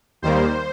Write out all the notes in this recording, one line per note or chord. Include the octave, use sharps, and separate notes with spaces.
D#2 D#3 G3 A#3 C5